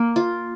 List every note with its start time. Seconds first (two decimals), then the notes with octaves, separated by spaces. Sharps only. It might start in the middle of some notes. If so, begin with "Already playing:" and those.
Already playing: A#3
0.16 F4